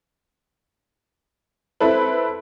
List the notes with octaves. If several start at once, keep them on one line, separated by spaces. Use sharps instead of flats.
C4 E4 A4 B4